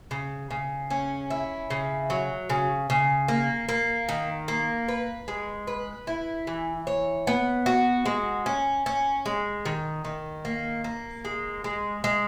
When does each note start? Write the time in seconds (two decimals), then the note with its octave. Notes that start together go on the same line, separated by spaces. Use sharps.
0.11 C#3
0.51 C#3
0.90 C#4
1.30 E4
1.70 C#3
2.10 F#3
2.50 C#3
2.90 C#3
3.28 A#3
3.69 A#3
4.09 D#3
4.48 A#3
4.88 B4
5.28 G#3
5.67 B4
6.07 E4
6.47 E3
6.87 C#5
7.27 B3
7.66 F#4
8.06 G#3
8.46 C#4
8.86 C#4
9.26 G#3
9.65 D#3
10.05 D#3
10.45 A#3
10.84 A#3
11.25 G#3
11.64 G#3
12.04 G#3